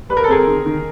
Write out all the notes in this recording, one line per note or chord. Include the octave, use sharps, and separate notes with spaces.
G3 B4
A#4
A4
C4 G#4 A#4
D#3
D#3